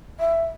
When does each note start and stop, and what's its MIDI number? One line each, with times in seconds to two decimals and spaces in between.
0.20 0.43 76